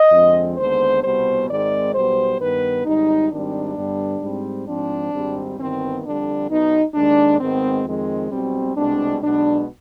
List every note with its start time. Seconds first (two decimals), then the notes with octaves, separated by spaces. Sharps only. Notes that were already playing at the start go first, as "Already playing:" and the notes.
Already playing: D#5
0.12 F2 D3 F3 G#3 C4
0.58 D#2 D3 G#3 B3 C5
1.03 C2 B2 G3 B3 C5
1.49 G#1 G#2 D#3 G#3 C4 D5
1.94 B1 B2 G3 B3 C5
2.39 G2 D#3 B3 B4
2.85 G#1 G#2 G3 D#4
3.31 G#1 G#2 D#3 G3 C4 D4
3.75 G2 D3 G3 B3
4.21 G#2 G3 C4
4.66 G#2 F3 C4 D4
5.12 G#1 G#2 G3 C4
5.58 G1 G2 D#3 B3 C4
6.03 F2 D3 G3 D4
6.49 B1 B2 B3 D#4
6.94 D#2 D#3 G#3 D4
7.39 G#1 G#2 D#3 G#3 B3 C4
7.85 F2 D#3 G#3 C4
8.31 B1 B2 G3 C4
8.76 C2 B2 G#3 C4 D4
9.22 B1 B2 G#3 B3 D4